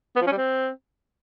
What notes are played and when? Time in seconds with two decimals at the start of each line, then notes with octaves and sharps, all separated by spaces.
0.16 B3
0.21 F3
0.27 C#4
0.32 G3
0.37 C4